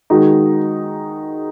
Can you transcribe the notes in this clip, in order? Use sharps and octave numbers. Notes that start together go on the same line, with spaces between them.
D#3 G#3 D#4 F#4